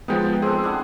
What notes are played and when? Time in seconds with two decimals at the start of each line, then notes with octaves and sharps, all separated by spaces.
0.08 F3 G#3 B3 D#4 F#5 G5
0.42 C4 G#4 A4
0.64 D4 E4 F#5